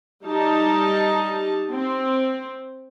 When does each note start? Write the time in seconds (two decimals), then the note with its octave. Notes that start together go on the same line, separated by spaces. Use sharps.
0.24 G3 D#4 A5
1.72 C4